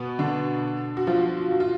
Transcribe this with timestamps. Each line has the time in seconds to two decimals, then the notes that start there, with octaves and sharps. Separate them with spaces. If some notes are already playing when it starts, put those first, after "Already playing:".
Already playing: B2 B3
0.19 D3 D4
0.97 F#4
1.07 F3 F4
1.51 F#4
1.60 F4